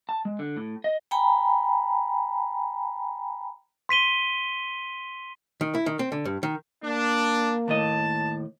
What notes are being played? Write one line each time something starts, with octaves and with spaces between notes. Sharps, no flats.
A5
G#3
D3
A2
D#5
G5 G#5 A#5 B5
C6 B6 D#7 G7
D#3
E4
D#3
C4
D3
G2
D#3
A#3 D4
D#2 A2 D#5 A5